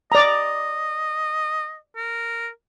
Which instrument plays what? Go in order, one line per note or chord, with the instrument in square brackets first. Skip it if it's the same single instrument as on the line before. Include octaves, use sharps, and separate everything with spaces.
[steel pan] D5 A#5 [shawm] D#5
[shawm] A#4